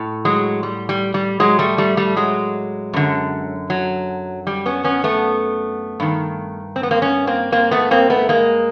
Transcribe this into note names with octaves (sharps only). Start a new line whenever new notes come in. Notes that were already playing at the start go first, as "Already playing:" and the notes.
Already playing: A2
F#3 G#3
G3
G3
G3
F#3 G#3
G3 A3
G3 A3
G3 A3
F#3 G#3
F#2 D3
F#3
G3
B3 C#4
B3 C#4
A3 B3
G2 D#3
C4
B3
A#3 C4
B3 C#4
A#3 C4
A#3 C4
A3 B3
A#3 C4
A3 B3
G#3 A#3